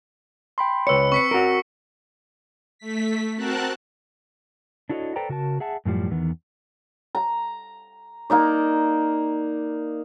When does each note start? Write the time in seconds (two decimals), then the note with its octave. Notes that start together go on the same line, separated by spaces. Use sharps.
0.58 G5 B5 C6
0.87 C#2 B4 C#5 B5 E6 C#7
1.12 C4 C#6 B6 C#7
1.31 F#4 A#4
2.79 A3 B6
3.36 C4 F#4 A#4 A5 F#6
4.90 D4 E4 F#4 A4 C#5 D#5
5.16 A4 B4 C5 D5 G5 A#5
5.29 C#3 F#4 A#4 A5
5.60 G#4 E5 F#5 A5
5.85 F#2 A2 F3 G3
6.11 E2 D#3 E3 B3
7.15 A#5
8.30 A#3 D#4 D5